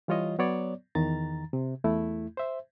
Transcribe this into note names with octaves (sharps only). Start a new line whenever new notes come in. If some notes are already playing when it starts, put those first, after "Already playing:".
E3 G3 F4 C#5 D#5
F#3 B3 C#5 D5
E2 D#3 A#5 A6
C3
E2 A3 E4
C5 E5